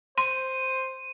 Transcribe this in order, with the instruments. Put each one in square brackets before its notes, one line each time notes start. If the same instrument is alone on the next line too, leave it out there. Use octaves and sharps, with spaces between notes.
[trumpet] C5 [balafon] C6 [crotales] D#7